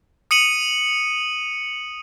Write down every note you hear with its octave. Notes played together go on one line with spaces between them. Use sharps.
D#6 C#7 D#7 F#7